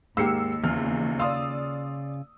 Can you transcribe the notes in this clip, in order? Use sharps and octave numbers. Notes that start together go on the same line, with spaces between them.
D#2 G#2 A#3 G4 E6 C7 C#7
E2 C#3 F4 F6
D5 F5 C6 D#6 E6